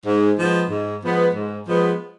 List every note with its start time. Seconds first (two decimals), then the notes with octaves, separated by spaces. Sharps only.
0.06 G#2
0.38 F3 G#3 B3
0.70 G#2
1.03 F3 G#3 B3
1.34 G#2
1.66 F3 G#3 B3